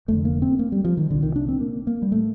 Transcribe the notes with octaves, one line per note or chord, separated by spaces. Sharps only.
F1 F2 D3 A3
A#3
C4
A#3
G3
F3
D#3
C2 A#2 D3
D#3
D4
C4
A#3
A#3
G3
A2 A3